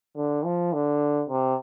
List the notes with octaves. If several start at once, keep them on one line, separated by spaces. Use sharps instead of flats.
D3
F3
D3
C3